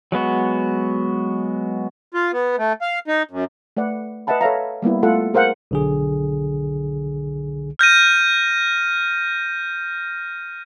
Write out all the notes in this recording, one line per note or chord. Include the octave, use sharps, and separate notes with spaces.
F#3 G#3 B3 F#4
F4
B3
A3
F5
D#4
F#2
A3 B4 D5 F#5
B4 D#5 E5 F#5 A5 B5
A4 C#5 E5 F5 A#5
G3 A#3 B3 E4
A3 F4 A4 F#5
G#4 A#4 C5 F5 F#5
B1 D3 G#4
F6 G6 A#6 D#7